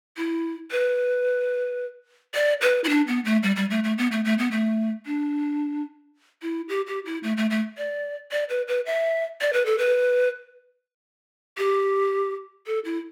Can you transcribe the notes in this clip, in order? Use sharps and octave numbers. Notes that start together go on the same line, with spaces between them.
E4
B4
D5
B4
E4
D4
B3
A3
G3
G3
A3
A3
B3
A3
A3
B3
A3
D4
E4
G4
G4
E4
A3
A3
A3
D5
D5
B4
B4
E5
D5
B4
A4
B4
G4
A4
E4